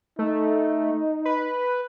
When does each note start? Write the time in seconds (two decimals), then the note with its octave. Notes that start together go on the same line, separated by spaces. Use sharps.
0.19 A3 D#4
1.25 B4